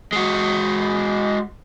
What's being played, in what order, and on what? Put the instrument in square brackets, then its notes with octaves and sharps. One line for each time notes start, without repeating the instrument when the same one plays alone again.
[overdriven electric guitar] G#3 F#4